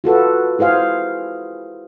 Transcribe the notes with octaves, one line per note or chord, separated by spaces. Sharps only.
F4 F#4 A4 B4
E4 G#4 C5 F5